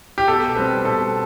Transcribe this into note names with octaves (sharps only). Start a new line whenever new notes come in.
G4
B2 A4
G3 C4 B4
B2 A4